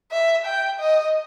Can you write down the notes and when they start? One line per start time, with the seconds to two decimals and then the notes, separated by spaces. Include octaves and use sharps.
0.11 E5
0.46 G5
0.79 D#5